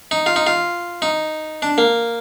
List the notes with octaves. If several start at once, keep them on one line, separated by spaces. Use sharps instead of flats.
D#4
F4
D#4
F4
D#4
D4
A#3